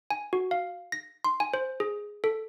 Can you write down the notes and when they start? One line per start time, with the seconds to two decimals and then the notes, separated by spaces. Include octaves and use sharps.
0.10 G#5
0.33 F#4
0.51 F5
0.92 A#6
1.24 C6
1.40 G#5
1.54 C5
1.80 G#4
2.24 A4